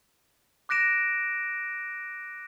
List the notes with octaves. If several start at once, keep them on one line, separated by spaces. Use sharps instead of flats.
D6 F#6 A#6 D7 E7